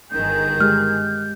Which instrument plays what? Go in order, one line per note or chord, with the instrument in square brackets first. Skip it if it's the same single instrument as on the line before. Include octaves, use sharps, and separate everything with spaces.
[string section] G1 D#3 G#4 [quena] G6
[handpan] G#3 G4 [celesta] F6